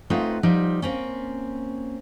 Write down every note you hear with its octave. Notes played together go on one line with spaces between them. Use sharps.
A3 C4 D#4 F4 B4 F#5
F3 G3 D#4
A#3 C4 C#4